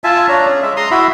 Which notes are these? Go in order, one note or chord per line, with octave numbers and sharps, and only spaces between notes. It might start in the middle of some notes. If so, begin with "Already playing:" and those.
F4 E5 G#5 A5
D4 C#5 A#5
C#4 G#4
G#3 E5
A#5 C6 D#6
E4 F#4 E5 B5